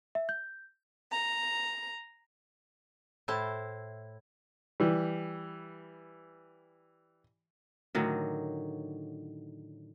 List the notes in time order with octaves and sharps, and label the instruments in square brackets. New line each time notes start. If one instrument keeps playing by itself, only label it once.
[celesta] E5
G6
[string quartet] A#5
[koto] A2 E4 C5 A5
[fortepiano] E3 G3
[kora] A2 D3 D#3 F#3